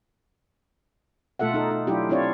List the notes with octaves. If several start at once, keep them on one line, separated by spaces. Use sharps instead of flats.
B2 A3 F4 A4 E5 F#5
D#4 A4
D#4
F#3 D4 E4 F4 G4
C4 D4 E4 F4 C#5 D5